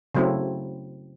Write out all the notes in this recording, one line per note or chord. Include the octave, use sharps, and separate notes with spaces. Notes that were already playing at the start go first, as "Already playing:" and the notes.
C#3 F#3 A3 C4 E4